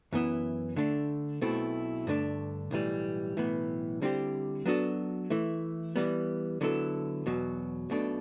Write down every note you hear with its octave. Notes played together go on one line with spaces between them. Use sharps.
F#2 E3 B3 E4
D3 A3 D4
B1 B2 A3 C4 E4
G2 D3 A3 D4
B1 A2 E3 G3
B1 A2 E3 B3
D3 G3 C4 E4 G4
F#3 B3 D4 F#4 A4
E3 A3 E4
E3 G3 B3
D3 F#3 B3 E4 A4
E2 B2 F#3
B1 B2 A3 D4